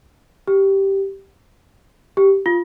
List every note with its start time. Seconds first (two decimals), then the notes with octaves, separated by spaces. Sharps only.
0.48 G4
2.17 G4
2.46 F4